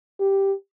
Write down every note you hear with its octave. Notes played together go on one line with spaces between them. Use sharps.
G4